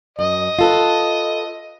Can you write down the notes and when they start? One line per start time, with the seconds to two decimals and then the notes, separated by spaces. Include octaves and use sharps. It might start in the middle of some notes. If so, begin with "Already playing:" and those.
0.19 F#2 D#5
0.59 F4 A4 B4